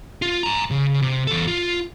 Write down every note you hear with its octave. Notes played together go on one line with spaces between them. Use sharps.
F4
G#5 A#5
C#3
C3
E2 A4
F4